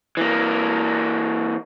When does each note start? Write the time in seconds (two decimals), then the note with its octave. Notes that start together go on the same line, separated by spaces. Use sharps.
0.17 E3 A#3